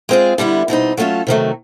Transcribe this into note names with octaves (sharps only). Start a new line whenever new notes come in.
G#3 C4 F4 G#4
D3 G3 B3 E4
B2 G3 C4 D#4
F#3 A3 C#4 F4 A4
C3 D#3 F#3 A3